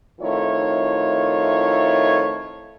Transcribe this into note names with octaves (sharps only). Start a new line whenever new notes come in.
F2 D#3 A3 E4 F4 C#5